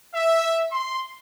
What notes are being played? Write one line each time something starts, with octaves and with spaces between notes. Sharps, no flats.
E5
C6